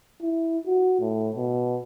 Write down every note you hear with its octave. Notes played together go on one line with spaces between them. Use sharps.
E4
F#4
A2
B2